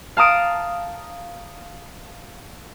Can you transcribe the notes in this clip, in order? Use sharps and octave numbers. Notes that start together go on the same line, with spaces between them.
F5 A5 A#5 D#6 D7